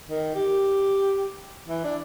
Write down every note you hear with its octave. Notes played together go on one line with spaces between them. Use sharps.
D#3
G4
E3
D4